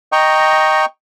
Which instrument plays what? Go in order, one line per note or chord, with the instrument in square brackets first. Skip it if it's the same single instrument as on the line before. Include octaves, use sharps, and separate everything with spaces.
[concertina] D#5 G5 A#5 C#6